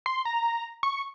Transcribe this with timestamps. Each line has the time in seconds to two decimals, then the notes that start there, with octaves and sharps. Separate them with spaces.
0.06 C6
0.25 A#5
0.83 C#6